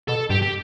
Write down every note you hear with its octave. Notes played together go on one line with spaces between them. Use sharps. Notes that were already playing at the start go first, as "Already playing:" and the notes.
B2 A4
G2 G4
G4